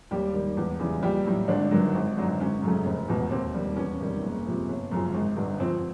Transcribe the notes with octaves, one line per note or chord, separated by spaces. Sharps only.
D#2 G3 G4
D#3 G3
E2
C#3 E3 G3
A#1 G3 G4
A2 F#3
G#1 D3 D4
G2 D#3 F#3
G#1
F#2 D3 F#3
G#1 C#4
F#2 C#3 F#3 A3
F1
E2 B2
D#2 C4
D#3 G3
E2 C#4
C3 D#3 G3
F#1
F2 C3
G1
F#2 C#3 F3 G#3
G#1
G2 D3
F2 C4